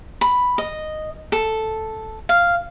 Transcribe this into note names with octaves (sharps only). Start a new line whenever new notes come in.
B5
D#5
A4
F5